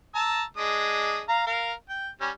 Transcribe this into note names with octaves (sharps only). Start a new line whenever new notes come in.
A5 A#5 E6
G#3 D4 D#6
F5 A#5
A#4 F5
G5
G3 C#4